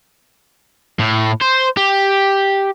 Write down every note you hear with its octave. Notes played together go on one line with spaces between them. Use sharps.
A2
C5
G4